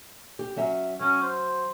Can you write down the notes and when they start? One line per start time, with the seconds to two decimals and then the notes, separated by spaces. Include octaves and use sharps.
0.39 G4
0.56 F#3 C#4 E5
1.00 F#3 C#4
1.22 C5